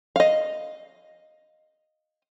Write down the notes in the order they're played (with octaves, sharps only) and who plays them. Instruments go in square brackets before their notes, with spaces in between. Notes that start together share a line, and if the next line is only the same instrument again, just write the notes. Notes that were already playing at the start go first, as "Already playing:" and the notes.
[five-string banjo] D#5 F5